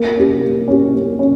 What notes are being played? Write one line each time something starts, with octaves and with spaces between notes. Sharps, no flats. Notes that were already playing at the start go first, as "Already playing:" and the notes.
Already playing: A#3
C#4 G4
A#3
C#4 G4
A#3
C#4